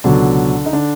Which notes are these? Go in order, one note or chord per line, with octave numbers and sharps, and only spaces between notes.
C#2 B2 D3 F#3 D4
D#4
D3 D4